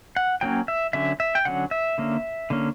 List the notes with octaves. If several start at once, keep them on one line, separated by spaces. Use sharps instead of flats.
F#5
F#3 A#3 C#4 G5
E5
D3 F#3 C#4 E5
E5
G5
D3 F#3 C#4 F#5
E5
D3 A#3 C#4
D3 A#3 C#4